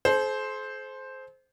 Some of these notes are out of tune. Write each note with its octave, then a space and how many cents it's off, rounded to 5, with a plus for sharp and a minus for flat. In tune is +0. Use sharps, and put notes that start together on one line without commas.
A4 -45 C5 +0